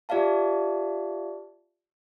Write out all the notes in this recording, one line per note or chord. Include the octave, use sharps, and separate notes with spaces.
F4 G4 D5 E5 F5 A5